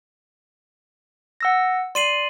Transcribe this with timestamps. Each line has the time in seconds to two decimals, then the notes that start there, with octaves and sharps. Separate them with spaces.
1.41 F#5 E6 A#6
1.95 D5 C6 C7 D#7 F#7